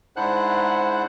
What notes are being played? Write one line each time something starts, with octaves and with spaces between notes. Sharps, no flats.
G#2 D4 E4 C5 F#5 F#6